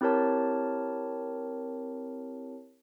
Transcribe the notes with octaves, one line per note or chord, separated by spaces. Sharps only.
C4 E4 G4 A#4 C#5 A5